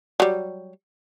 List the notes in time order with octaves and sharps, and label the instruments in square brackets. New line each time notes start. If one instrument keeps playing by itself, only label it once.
[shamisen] F#3 G3